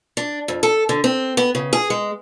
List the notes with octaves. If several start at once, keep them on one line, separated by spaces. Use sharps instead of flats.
D4
F2
A4
D3
C4
B3
C#3
G#4
G#3